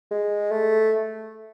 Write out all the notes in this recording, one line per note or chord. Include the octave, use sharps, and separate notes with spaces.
G#3
A3